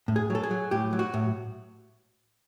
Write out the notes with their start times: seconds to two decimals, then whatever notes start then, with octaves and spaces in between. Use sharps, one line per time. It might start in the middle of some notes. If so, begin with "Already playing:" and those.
0.08 A2
0.16 G#4
0.30 F#3 A4
0.43 G#4
0.51 F#3
0.71 A2 G4
0.93 F#3
0.99 F#4
1.14 A2